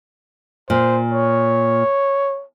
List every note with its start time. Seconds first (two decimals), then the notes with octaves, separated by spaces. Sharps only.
0.70 A#2 C5
1.13 C#5